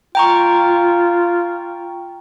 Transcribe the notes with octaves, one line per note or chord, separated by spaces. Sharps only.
F4 G5 A#5 C#6